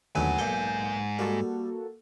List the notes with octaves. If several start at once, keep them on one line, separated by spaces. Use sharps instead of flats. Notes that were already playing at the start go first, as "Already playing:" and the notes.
D#2 G#2 D3 D#3 F#3 A3 B3 G#5
B1 A#2 A4 G6
G3 A#3 F#4 A4